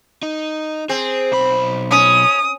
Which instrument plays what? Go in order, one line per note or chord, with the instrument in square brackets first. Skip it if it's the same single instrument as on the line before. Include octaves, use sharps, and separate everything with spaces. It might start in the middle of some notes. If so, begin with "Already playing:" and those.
[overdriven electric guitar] D#4
[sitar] C4 [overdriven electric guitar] G#4
[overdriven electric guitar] B1 B5
[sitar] C#4 [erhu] D#6